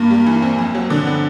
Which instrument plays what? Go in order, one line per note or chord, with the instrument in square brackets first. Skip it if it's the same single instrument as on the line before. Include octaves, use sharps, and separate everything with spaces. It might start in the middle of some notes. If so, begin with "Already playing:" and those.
Already playing: [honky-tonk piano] G2 [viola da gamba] A#3
[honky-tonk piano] G3
E3
C4
F2
F#3
D3
B3